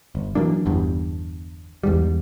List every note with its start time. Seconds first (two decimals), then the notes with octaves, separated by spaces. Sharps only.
0.15 G1
0.35 E3 F#3 A#3 D4
0.65 G1 E2 G2
1.83 E2 G#2 G3